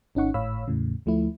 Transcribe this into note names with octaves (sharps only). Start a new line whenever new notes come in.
G#1 C#4 D#4 F#5 C#6
G#1 A2 C#5 F5 B5 E6
E2 A2 C#3
D2 F3 A3 E4